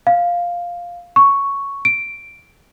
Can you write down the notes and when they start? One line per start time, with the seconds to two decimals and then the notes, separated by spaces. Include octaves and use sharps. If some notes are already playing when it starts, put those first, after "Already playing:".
0.07 F5
1.16 C#6
1.85 D7